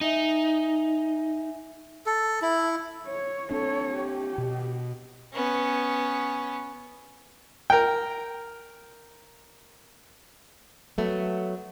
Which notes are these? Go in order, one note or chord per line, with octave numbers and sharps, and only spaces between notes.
D#4 E5 G#5
A4
E4
C#5
C4 D4 A4 C#5
G4
B2
B3 C#4
A#4 G5
F#3 A3 B3